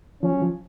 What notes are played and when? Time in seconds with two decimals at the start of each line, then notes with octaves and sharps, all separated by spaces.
0.23 F3 C#4
0.32 F#3
0.42 F3